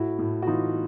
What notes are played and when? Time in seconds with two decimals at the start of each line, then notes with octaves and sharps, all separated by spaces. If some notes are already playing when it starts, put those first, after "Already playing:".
Already playing: A2 E4 F#4
0.19 A2
0.42 F#4
0.47 E3 D#4 F4